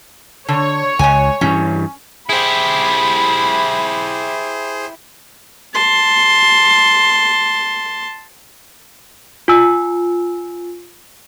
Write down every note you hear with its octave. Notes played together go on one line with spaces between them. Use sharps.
D3 C#5
C#2 G#3 G#5
G2 E3 C#4
E4 G4 G#4 C5 B5
A5 C6
F4 G#5 E6